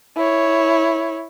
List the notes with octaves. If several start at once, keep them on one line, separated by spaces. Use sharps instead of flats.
E4 C#5